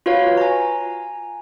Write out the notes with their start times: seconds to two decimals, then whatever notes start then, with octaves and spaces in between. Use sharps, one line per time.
0.06 F4 F#4 B4 C#5 F5
0.37 G#5 A#5